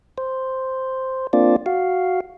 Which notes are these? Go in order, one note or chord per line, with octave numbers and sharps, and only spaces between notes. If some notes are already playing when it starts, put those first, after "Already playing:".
C5
A#3 C4 D4 F4 D5
F#4 F5